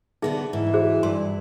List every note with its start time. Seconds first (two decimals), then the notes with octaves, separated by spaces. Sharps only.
0.22 D3 B3 D#4 F#4 G#4 E5
0.53 G#2 E3
0.74 F#4 G#4 C5
1.03 G2 C6